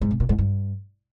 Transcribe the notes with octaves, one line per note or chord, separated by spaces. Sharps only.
G#2
C3
A#2
G#2
G2